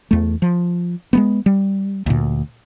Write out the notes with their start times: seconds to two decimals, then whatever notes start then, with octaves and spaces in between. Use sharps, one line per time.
0.11 E2 A3
0.42 F3
1.13 G#3 A#3 B3
1.46 G3
2.06 D2 A#2